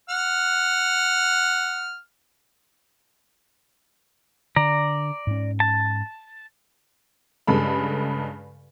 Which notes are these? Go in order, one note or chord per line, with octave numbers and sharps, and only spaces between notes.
F#5 F6
D3 D5 A#5
G#2 C#4
A5
G2 C#3 G#3 A4 B5